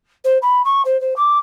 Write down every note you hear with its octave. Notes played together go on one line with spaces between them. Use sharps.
C5
B5
C#6
C5
C5
D6